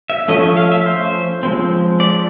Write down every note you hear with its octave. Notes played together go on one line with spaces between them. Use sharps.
E5
F3 A3 C#4 D#5
E5
F5
E5
C5
F3 G#3 C4
D5